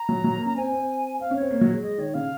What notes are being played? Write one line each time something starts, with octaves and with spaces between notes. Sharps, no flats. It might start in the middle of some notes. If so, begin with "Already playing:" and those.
Already playing: A#5
F#3
F#3
A#3
C#4 A#5
C4 G#5
C4
C4 F5
C#4
C4 C#5
A#3
F#3
G#3
G#3 D#5
D#3 C#5
C#3 F5